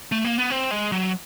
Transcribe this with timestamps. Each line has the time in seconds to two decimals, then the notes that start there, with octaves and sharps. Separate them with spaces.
0.12 A3
0.25 A#3
0.38 B3
0.50 C4
0.71 G#3
0.92 F#3